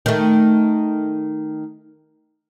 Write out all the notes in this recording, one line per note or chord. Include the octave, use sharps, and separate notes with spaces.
D#3 A3